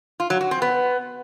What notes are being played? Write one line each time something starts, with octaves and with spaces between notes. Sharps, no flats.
F4
F#3
F#4
C4
B3